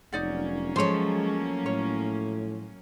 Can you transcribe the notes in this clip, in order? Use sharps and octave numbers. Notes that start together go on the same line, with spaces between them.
F1 F#3 A#3 C#4 D#4 D5 F#5
F3 G#3 A3 C5 C#5
A2 C#5